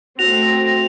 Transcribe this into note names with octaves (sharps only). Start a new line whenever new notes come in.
A3 C4 F#4 A#6 F7